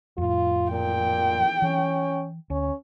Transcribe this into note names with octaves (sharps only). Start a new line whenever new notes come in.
F2 A2 F4
A#2 G5
E3 C#4
D2 C#4